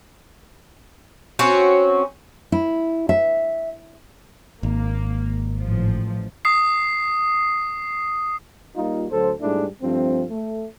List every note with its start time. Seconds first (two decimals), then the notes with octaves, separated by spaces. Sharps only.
1.39 C4 C#4 F#4 C#5
2.52 E4
3.09 E5
4.63 G#1 A#3
5.60 A1 F3
6.45 D#6 C7
8.76 G3 A#3 D#4 F4
9.11 D2 F#3 A4 C5
9.41 G#2 G3 A3 D4 E4 G#4
9.82 G2 F3 A3 C4
10.31 A3